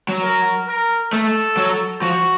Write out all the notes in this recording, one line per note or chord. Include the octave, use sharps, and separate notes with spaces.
F#3
A#4
A#4
A3 A4
F#3
F3 F#4